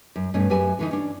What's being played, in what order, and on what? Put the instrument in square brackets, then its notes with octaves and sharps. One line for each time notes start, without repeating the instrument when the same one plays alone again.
[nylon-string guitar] F#2
G2 B2 A3 C#4
F#2 G4 B4 E5 G#5
D3 E3 D#4
C#4 D4